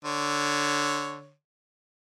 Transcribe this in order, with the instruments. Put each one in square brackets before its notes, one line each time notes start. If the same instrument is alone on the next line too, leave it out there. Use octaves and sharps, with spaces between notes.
[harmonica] D3 C#5